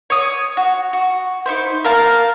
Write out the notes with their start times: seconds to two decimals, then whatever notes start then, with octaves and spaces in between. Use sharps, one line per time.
0.10 C#5 D#6
0.57 F#4
0.93 F#4
1.46 D#4 E4 C5
1.84 A#4 F5 A5